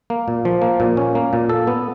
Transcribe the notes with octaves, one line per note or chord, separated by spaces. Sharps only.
A#3
A#2
F3
A#3
A#2
C#4
A#3
A#2
A4
B3